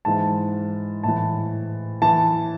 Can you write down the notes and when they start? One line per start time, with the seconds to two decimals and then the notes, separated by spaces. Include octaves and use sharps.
0.05 G#2 E3 A5
1.03 A2 E3 A5
2.02 E3 A5